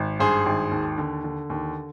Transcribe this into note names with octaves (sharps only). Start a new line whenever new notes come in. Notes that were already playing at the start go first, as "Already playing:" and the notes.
Already playing: G#1
G2 G#4 C5
G#1
D#2
D3
D3
D#2